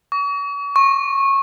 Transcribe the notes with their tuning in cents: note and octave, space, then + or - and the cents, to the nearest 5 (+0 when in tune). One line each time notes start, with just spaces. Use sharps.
C#6 +40
C#6 -20